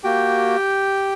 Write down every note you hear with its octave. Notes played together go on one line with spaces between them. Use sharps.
A#3 F#4 G4 G5